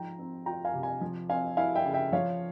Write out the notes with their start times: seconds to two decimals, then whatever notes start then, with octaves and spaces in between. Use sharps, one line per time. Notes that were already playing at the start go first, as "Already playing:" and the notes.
Already playing: G#2 F3 G5 A#5
0.19 C4
0.46 F4 G5 A#5
0.65 F5 G#5
0.74 C3
0.83 F5 G#5
1.01 F3
1.29 C4 F5 G#5
1.57 E4 F5 G#5
1.75 E5 G5
1.85 C#3
1.94 E5 G5
2.12 F3 C#5 F5